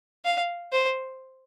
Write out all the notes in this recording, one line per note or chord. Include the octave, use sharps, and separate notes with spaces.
F5
C5